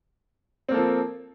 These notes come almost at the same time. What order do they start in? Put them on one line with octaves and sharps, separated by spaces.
C4 A#3 A4 F3